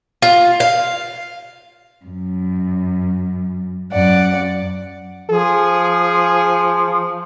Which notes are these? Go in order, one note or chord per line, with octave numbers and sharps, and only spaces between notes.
F4
F5
F#2
F#2 D5 F#5
F3 G#4